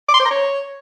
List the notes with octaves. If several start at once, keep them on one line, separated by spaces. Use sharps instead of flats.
D6
C6
C5
A#5
C#5